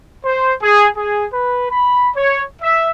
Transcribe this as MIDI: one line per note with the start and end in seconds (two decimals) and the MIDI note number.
0.24 0.52 72
0.61 0.87 68
0.96 1.24 68
1.31 1.69 71
1.69 2.09 83
2.15 2.43 73
2.61 2.89 76